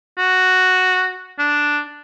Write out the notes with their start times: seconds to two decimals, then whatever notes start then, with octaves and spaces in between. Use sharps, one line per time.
0.18 F#4
1.39 D4